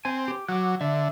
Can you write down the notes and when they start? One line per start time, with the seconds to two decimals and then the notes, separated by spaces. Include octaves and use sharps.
0.05 C4 G#5
0.28 G4
0.49 F#3 D6 F#6
0.81 D3 E5